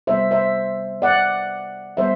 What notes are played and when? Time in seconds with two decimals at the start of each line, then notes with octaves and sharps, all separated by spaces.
0.07 C3 G3 B3 C5 E5
0.31 C5 E5
1.02 D5 F#5
1.97 E3 G3 B3 C5 E5